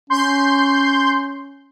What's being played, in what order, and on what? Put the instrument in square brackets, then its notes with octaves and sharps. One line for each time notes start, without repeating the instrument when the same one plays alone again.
[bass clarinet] C#4 [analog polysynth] C6 G6